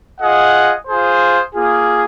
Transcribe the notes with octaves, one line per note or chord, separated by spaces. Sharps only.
F4 G#4 D#5 F#5
F4 G#4 C5
A#3 F4 G#4